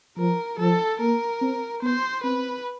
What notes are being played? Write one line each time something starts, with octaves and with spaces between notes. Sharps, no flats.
F3 A#4
F3 A4
A#3 A#4
C4
B3 C5
C4 B4